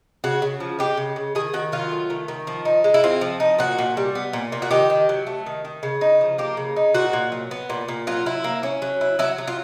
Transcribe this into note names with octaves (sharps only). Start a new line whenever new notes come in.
C#3 F#4
C#3
F3
G#3 G4
C#3
C#3
D#3 G#4
D#3 F#4
F#3 F4
A3
D#3
D#3
F3
D#4
G#3
E4
C4 F4
F3
D#4
A#2 F#4
A#2
G3
B3
A#2
A#2
F#4
D#3 G4
D#3
F#3
A3
D#3
D#3
C#3
D#4
F3
A#3 G4
C#3
D#4
A#2 F#4
A#2
F#3
B3
A#2
A#2
F#3 F4
E4
A#3
C#4
F#3
E4
F#3 E4
F#3
F4